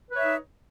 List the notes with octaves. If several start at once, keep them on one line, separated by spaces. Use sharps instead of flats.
D#4 B4 C#5 E5